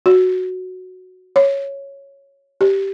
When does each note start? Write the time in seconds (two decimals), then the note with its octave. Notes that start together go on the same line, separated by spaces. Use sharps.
0.06 F#4
1.36 C#5
2.61 G4